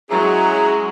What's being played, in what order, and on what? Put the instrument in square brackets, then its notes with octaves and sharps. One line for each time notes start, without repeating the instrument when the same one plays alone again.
[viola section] F#3 G#3 [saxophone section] C#4 E4 G#4 [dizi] A#5